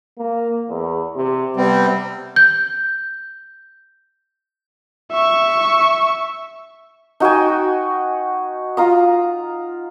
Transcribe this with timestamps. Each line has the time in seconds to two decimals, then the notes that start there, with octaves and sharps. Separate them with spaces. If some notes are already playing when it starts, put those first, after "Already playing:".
0.18 A#3
0.69 E2
1.16 C3
1.57 C3 G3 B3 C4
2.36 G6
5.12 E5 C#6
7.20 D#4 F#4 G5 G#5
8.77 F4 A#5 D#6